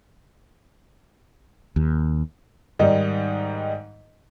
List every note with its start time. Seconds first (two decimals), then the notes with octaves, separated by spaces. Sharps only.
1.76 D#2
2.79 G#2 D#3 G3 D#4